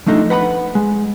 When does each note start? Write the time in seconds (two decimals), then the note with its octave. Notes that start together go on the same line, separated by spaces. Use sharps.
0.06 F3 A3 D4 D#4 A4
0.30 B4 F#5 A#5 B5
0.75 G#3